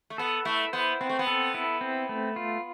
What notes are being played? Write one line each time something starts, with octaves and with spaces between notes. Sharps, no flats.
A3
B3 A4
A3 E4
B3 C5
B3 C4
A3
B3
A4
E4
C4
A3
F4